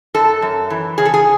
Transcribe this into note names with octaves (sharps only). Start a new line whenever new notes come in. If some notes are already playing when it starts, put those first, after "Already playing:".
F#2 A4
F#2
E3
C#3 G#4
A4
G#4